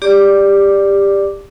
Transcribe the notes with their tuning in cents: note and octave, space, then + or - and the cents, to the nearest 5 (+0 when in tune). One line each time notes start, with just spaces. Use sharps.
G4 +20 D5 +0 D6 +0